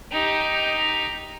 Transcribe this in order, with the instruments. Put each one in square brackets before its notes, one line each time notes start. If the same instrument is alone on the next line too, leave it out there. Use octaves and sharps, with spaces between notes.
[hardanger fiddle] D#4 G4